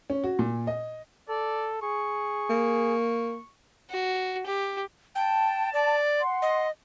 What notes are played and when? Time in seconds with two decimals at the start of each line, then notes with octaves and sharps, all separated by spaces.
0.10 C#4
0.24 F#4
0.39 A#2
0.67 D#5
1.29 A4 D5
1.82 G#4 C#6
2.50 A#3
3.90 F#4
4.46 G4
5.15 G5 A5
5.73 D5
6.19 F#5 C6
6.42 D#5